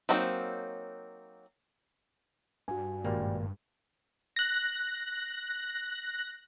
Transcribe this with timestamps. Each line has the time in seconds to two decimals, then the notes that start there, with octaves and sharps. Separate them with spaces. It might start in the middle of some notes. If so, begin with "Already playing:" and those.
0.09 F#3 A#3 C4 D#4
2.68 G2 F#4 G#5
3.04 G#1 A#2 G3 A#3
4.36 F#6 A#6